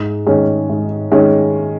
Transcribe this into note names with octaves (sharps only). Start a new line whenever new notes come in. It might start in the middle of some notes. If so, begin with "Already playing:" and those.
Already playing: G#2
D#3 G#3 C#4
G#2
D#3 G#3 C#4